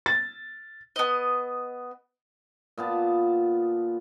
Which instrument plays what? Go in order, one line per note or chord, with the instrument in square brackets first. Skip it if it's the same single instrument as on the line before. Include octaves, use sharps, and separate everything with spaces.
[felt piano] A6
[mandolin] B3 D#5
[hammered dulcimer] A#2 B3 A5